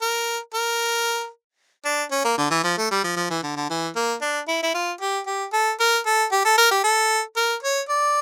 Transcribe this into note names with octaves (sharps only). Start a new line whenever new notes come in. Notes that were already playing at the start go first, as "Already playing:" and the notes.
A#4
A#4
D4
C#4
A#3
D3
E3
F3
A3
G3
F3
F3
E3
D3
D3
E3
A#3
D4
E4
E4
F4
G4
G4
A4
A#4
A4
G4
A4
A#4
G4
A4
A#4
C#5
D5